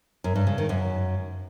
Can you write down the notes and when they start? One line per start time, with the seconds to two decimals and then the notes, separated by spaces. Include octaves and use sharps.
0.24 F#2
0.35 G2
0.47 C#3
0.58 D#3
0.69 F#2